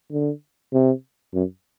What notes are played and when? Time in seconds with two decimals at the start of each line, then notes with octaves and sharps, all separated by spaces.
0.12 D3
0.73 C3
1.34 F#2